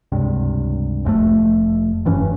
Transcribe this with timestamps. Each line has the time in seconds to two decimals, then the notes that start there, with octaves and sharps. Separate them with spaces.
0.12 C#2 G2 C3
1.05 F1 F2 G#2 A3
2.05 E1 G2 E3 C#4